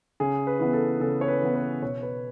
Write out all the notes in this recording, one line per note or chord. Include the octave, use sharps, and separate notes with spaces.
C#3 G#4
B4
E3 B3
A4
C#3 A4
C#5
B4
E3 B3
B4
B2 C#5
B4